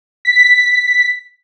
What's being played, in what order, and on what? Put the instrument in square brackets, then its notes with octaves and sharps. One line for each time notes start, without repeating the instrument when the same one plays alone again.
[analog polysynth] B6